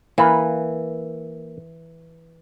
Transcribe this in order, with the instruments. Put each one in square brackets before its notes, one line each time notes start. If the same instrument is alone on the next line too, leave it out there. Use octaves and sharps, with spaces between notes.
[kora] E3 [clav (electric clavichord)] A#3 B4